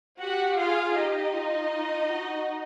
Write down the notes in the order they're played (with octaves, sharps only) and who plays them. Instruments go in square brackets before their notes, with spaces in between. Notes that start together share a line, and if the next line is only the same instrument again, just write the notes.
[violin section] F#4 F#5 [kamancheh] G4
[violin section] F4 F5 [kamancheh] G#4
[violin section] D#4 D#5 [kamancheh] G4
[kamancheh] F4
F#4